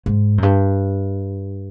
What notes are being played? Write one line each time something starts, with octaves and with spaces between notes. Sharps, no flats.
G#2
F#2
G2